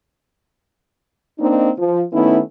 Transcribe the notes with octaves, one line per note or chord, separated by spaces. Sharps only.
A#3 C4 D4 D#4
F3
D#3 A3 B3 C#4 D#4 E4